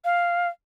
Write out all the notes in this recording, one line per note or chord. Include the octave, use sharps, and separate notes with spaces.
F5